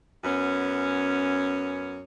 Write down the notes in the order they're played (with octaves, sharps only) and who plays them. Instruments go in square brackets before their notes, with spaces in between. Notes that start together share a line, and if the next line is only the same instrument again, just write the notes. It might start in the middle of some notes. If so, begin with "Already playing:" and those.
[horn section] F#2 B3 C#4